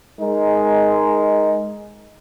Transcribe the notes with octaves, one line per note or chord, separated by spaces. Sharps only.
G#3 D#4 A#4